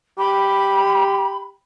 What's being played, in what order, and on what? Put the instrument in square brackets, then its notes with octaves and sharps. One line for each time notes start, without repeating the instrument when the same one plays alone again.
[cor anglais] G4 [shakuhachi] B5